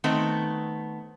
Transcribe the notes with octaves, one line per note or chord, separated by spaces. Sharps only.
D#3 A3 B3 C4